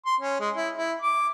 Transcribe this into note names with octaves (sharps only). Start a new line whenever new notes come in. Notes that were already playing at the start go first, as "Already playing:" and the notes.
C6
C#4
G#3
E4
E4
D6